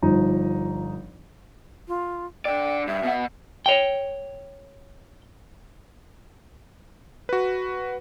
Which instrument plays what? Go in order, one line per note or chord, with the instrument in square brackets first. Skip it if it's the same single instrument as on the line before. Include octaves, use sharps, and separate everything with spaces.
[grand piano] G1 F3 D#4
[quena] F4
[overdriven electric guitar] D3 D5 [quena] G5
[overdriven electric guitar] G2 [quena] E5
[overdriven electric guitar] B2 F#5
[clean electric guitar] C#5 G5
[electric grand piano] F#4 B4